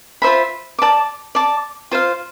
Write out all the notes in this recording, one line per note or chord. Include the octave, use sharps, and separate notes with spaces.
F4 C5 E5 B5
D5 A5 D6
D5 A5 D6
F4 C5 F5